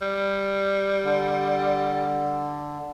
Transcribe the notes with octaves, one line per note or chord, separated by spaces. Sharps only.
G3
D3